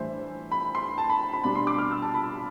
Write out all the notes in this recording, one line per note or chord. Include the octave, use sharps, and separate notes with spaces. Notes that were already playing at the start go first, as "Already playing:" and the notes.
Already playing: A2 E3 G3 D4 C5 E5
B5
C6
A5
B5
B5
B2 G3 D4 B5
C6
D6
F6
E6
A5
B5
B5